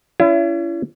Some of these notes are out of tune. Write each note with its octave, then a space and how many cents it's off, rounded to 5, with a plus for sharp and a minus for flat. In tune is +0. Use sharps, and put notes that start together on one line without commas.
C#4 +40 E4 +40 G#5 +0